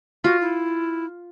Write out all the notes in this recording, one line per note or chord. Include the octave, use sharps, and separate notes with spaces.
F4 F#4
E4